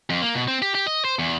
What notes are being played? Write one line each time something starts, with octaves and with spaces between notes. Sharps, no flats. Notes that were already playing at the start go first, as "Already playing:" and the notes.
F2
A#3
B2
C4
G4
G4
D#5
C5
E2